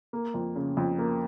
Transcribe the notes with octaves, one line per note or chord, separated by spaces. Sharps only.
A#3
F2
C#3
F2
A#3